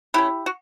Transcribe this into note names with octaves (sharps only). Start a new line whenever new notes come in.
F#3 A3 C#4 E4 G4
F#4